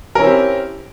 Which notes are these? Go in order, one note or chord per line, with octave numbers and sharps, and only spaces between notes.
C4 C#4 E4 G4 A#4